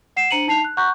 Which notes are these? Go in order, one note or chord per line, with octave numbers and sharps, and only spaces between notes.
F#5 C7 E7
D4 C5 A#5 C#7 D#7 F#7
D#4 A5 C7 F7
F#6
F#5 A#5 C#6 F#6 G6